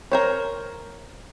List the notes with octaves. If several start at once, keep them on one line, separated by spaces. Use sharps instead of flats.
A#4 C5 C#5